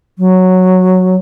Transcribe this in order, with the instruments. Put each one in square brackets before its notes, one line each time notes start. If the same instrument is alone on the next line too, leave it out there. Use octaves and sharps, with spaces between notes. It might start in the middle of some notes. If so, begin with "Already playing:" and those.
[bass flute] F#3